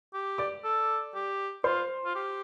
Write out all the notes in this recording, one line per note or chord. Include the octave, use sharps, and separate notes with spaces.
G4
D5 D6
A4
G4
F4 C5 C6
F4
G4